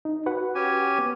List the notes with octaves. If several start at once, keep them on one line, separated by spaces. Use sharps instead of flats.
D#4
F#4 B4 F#5
C#4 G4 G#5
B3